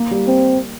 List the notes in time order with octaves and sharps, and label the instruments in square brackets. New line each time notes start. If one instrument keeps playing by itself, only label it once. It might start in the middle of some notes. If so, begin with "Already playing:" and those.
Already playing: [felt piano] A#3
G3
[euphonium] C4